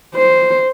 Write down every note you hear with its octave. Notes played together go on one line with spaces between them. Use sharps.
C5